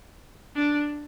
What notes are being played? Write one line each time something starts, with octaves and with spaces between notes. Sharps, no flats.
D4